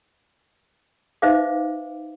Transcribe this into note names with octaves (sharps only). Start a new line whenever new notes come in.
D#4 B4 C5 E5 F5 D6